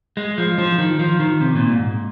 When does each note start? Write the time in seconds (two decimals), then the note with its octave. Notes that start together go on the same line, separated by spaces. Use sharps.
0.17 G#3
0.38 F3
0.58 F3
0.78 D#3
0.99 F3
1.20 D#3
1.41 C3
1.56 A#2
1.72 G#2